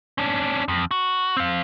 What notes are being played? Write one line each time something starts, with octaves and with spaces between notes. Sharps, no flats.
C#4 D4
F2
F#4
C4 F5